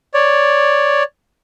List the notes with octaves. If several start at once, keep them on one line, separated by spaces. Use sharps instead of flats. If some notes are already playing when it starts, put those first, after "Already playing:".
C#5 D5